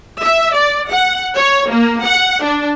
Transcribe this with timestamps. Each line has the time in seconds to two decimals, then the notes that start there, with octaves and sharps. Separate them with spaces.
0.22 E5
0.54 D5
0.91 F#5
1.36 C#5
1.70 A#3
2.05 F#5
2.44 D4